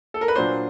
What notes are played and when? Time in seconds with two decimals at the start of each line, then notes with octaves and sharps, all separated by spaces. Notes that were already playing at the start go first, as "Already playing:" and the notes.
0.14 A4
0.21 A#4
0.28 B4
0.36 A#2 F#3 A#3 D4 C5